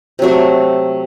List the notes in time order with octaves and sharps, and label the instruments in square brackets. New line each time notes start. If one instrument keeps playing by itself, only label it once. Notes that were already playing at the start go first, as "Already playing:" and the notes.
[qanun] C3 F#3 A3